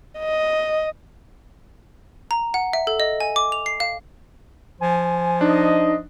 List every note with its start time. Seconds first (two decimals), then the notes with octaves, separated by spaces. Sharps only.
0.19 D#5
2.31 A#5
2.54 F#5
2.73 E5
2.87 A4
3.00 D#5
3.20 G#5
3.36 D6
3.52 F7
3.66 C7
3.80 F5
4.81 F3 G#5
5.41 D4 D#4 D#5